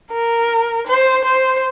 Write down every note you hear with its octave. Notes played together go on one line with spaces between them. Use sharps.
A#4
C5
C5